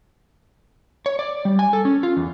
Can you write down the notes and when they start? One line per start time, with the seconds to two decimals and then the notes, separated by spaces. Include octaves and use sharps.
1.06 C#5
1.19 D5
1.45 G3
1.59 G#5
1.73 A4
1.85 C#4
2.03 F4
2.17 E2